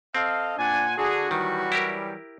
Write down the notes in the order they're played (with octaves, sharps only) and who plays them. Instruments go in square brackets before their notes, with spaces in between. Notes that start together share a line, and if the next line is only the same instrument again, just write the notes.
[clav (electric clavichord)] C4 [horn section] A4 D#5 F5
[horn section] A#2 F#5 G#5 [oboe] D4
[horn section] D3 D4 G#4 [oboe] F#4
[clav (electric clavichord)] D#3 [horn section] E3 F#3 G3
[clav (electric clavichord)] E4 G4 A#4